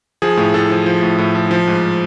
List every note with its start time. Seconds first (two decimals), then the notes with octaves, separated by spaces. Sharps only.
0.22 F3 G#4
0.37 A2
0.54 A2 A4
0.70 F3
0.86 F3
1.02 A2
1.18 A2
1.35 F3
1.51 F3
1.67 G#2